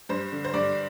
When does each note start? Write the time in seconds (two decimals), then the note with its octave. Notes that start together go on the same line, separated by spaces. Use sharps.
0.09 G2 C5
0.32 D3
0.45 C5
0.54 G2 D5